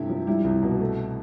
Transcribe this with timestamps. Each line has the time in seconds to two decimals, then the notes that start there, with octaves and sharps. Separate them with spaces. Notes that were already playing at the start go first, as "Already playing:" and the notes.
Already playing: G2 C3 A3 E4 G4
0.09 F3
0.27 G3 E4
0.44 C2
0.63 B2
0.80 A3